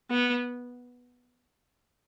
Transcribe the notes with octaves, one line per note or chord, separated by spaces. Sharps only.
B3